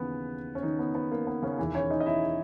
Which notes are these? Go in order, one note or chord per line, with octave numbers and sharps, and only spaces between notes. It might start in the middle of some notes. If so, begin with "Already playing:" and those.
Already playing: D#2 C#3 E3 B3 B4
C#4
D#3 D#4
B3
B3
A#3
B3
C#3 C#4
E1 E2 D#3 E3 E4
C#4 C#5
D#4 D#5
D#5
E4 E5